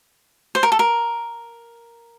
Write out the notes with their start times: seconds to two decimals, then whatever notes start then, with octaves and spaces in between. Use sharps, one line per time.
0.55 C5
0.63 A#4
0.72 A4
0.79 A#4